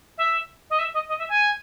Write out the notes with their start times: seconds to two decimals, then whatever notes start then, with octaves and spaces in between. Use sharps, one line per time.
0.18 E5
0.70 D#5
0.79 E5
0.94 D#5
1.09 D#5
1.19 E5
1.29 G#5